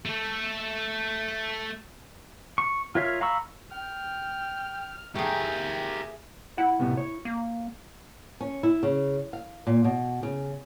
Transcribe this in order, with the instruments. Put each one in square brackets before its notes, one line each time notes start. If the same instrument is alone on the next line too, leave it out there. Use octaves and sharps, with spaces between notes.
[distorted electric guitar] A3 A4
[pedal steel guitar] C#6
F4 A#4 C#5 E5 F5
F5 A#5 B5 C#6 E6
[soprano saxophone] G5 [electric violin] F6
[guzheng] A3 G#4 [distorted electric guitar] G4 A#4 [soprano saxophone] G5 [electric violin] G#5
[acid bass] E4 [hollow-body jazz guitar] F#5
[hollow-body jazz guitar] A2 C3 B3
C#5
[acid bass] A#3
[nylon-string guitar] C#4
E4
C#3
F5
A#2
B2
C#3